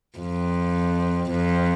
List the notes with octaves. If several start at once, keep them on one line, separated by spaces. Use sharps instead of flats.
F2
F2